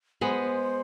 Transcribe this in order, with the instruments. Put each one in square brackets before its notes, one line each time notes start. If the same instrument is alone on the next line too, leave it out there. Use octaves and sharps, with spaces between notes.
[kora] G#3 B3 [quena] C5